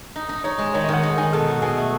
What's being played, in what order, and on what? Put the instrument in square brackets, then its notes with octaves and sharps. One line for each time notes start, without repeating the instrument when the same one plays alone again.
[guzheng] D#4
D#4
[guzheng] D#4 [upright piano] C#5
[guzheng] G#3
[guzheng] D#3 [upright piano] C#5
[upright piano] D#5
[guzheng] D#3 [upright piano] F#5
[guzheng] D#4
[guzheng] D#3 [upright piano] G#5
[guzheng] B2 [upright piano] A4
[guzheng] F#3
[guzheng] B2 [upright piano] G#4
[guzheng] A3